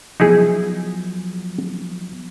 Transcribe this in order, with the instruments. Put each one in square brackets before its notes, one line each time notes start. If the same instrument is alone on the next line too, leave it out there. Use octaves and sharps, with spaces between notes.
[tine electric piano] F3 F#3 B3 [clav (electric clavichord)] D#4 E4 G#4